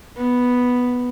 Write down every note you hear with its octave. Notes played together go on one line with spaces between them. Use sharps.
B3